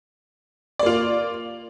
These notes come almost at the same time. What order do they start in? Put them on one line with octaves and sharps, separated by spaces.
D5 A#3 F4